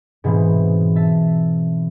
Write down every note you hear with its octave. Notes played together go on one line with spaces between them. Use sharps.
G#2 B2 E3 B3 C4
E5 A5